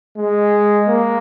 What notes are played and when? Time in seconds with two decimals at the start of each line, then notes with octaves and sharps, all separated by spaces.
0.17 G#3
0.88 A#3